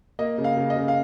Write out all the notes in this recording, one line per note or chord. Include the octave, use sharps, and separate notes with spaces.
A#3 D#5
C#3
F5
C#3
D#5
C#3
F5